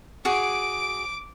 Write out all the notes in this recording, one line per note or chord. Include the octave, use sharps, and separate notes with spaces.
F#4 G#4 D6 D7